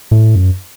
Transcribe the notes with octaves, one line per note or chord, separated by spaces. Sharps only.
A2
F#2